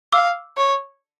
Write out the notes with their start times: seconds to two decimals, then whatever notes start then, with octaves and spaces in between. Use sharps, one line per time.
0.12 F5 D6 E6
0.57 C#5